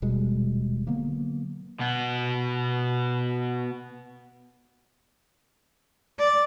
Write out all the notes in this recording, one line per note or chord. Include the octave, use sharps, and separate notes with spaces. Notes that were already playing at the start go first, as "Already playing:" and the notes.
D#1 B2 G3 G#3
D3 F#3 A#3 B3
B2 B3
D5